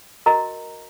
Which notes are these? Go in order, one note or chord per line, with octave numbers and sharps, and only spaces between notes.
F#4 A#4 D#5 A#5